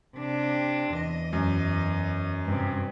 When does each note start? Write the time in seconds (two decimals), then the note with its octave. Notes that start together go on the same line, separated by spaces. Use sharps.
0.17 C3 D4
0.94 E2 D#5
1.33 F#2
2.45 G2 C3